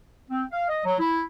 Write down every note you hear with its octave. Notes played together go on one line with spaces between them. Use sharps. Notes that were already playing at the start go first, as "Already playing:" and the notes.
C4
F5
D#5
F#3
E4